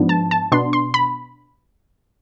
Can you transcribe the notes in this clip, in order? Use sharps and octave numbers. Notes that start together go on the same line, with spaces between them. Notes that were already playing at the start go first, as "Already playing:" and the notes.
Already playing: G#2 F3 B3 D4
A5
A5
B2 B3 D4 C6
C6
B5